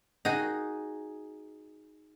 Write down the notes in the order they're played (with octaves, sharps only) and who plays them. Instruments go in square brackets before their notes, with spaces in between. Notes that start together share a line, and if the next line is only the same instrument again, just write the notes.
[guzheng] D#4 F#4 G#4